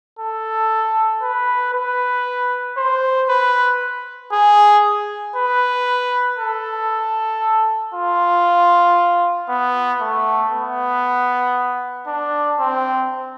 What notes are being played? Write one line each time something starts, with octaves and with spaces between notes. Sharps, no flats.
A4
B4
B4
C5
B4
G#4
B4
A4
F4
B3
A3
B3
D4
C4